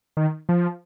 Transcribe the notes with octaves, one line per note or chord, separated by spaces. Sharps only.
D#3
F3